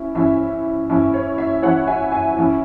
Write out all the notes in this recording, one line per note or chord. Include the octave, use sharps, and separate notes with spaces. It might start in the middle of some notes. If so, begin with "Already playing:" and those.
Already playing: C#4 E4 E5
E3 C#4 E4 E5
E3 C#4 E4 E5
C#5
E5
E3 C#4 E4 C#5 F#5
E5 G#5
E5 G#5
E3 C#4 E4